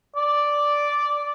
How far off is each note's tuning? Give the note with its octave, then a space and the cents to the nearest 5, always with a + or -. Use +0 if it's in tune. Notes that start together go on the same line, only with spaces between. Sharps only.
D5 -5